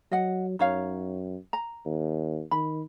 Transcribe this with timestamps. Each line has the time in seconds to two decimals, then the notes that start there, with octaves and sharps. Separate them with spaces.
0.12 F#3 D#5 F#5
0.59 F#2 D#4 C#5 F5
1.53 A#5
1.85 D#2
2.51 D#3 B5